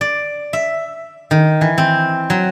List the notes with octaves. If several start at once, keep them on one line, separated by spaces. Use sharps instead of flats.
D5
E5
D#3
E3
C4
F#3